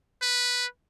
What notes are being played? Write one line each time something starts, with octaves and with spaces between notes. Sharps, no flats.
B4